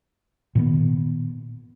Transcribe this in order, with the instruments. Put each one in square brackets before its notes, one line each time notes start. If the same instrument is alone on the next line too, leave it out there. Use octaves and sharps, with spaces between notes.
[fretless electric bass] A#2 D#3 B3